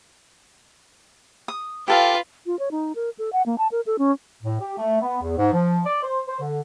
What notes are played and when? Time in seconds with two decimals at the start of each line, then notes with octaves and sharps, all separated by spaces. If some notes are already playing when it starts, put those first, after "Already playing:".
1.48 D#6
1.88 F4 G4 A4 B4 F5
2.46 F4
2.59 C#5
2.71 D#4
2.95 A#4
3.19 A4
3.33 F#5
3.46 A#3
3.58 A5
3.71 A#4
3.86 A4
3.99 C#4
4.43 A2
4.60 G4
4.78 A3
5.01 B3
5.22 E2
5.37 G#2
5.53 F3
5.85 D5
6.03 C5
6.28 C5
6.40 D3